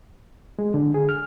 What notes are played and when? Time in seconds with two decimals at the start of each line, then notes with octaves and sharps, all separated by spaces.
0.59 G#3
0.74 D3
0.94 G#4
1.09 F6